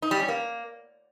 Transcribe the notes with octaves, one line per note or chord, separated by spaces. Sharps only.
D#4
G3
C#4
A#3